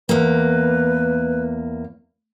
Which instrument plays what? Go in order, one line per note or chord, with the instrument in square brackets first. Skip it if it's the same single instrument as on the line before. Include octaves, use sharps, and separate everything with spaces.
[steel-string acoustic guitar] E2 A#3 [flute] B4